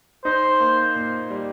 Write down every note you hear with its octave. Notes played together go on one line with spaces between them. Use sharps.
D#4 C5
A#3
A#2
G3